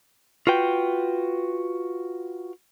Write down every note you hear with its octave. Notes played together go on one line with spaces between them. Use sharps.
F4 F#4 B4 G5